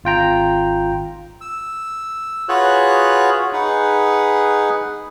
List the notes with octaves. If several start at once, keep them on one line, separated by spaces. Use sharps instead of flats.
G#1 F4 G5 A#5
E6
F4 F#4 G#4 B4 C#5 F#6
D#4 G#4 B4 F#5